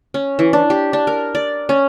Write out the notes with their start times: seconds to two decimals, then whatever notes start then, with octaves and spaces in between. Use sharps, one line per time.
0.14 C#4
0.39 E3
0.53 D4
0.70 G4
0.93 D4
1.07 A#4
1.35 D5
1.69 C#4